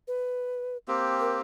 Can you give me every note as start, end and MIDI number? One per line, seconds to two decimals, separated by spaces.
0.08 0.77 71
0.88 1.41 58
0.88 1.41 60
0.88 1.41 67
1.20 1.37 70